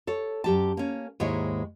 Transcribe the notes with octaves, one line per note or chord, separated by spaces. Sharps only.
A4 C#5
F#2 G4 A5
A#3 C#4
D#2 G#2 G#3 E4 C#5